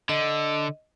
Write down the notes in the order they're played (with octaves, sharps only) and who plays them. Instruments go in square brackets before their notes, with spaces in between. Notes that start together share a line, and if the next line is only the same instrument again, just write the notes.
[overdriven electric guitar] D3 [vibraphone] D#5